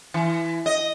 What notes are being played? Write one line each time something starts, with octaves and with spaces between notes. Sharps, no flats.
E3
D#5